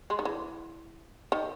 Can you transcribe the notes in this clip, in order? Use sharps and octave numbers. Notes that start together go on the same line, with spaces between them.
G#3
D#3
E3
D#3